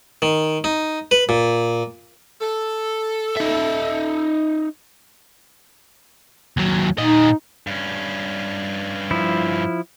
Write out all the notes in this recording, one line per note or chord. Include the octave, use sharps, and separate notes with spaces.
D#3
D#4
B4
A#2
A4
D#4 E5
D#2 F#3
A#2 D#4 D#5
G2 C#4
F3 E4